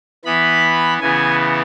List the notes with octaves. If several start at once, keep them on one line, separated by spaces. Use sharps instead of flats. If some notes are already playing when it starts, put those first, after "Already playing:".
E3 B3 B5
C#3 E3 B3 G#5